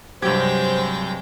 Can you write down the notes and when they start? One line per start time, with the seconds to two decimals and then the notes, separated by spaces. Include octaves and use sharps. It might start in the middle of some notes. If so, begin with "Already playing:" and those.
0.22 G2 C3 F#3 G#3 G4 C5 G5 G#6